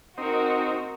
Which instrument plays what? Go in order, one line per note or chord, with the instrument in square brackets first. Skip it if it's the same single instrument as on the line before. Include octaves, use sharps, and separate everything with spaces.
[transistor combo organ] C4 D#4 [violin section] F#4 A#4